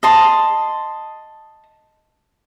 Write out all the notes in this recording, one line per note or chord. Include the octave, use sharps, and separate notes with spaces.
D#5 A5 C6